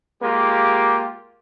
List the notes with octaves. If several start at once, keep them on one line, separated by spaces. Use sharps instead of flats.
G#3 A#3 F4 G4